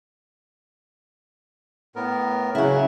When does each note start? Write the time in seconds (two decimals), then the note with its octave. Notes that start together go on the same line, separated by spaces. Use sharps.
1.96 A2 B3 A#4
2.55 C#3 F#3 E4 F#5